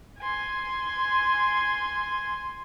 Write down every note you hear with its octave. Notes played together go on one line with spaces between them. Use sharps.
G#5 C6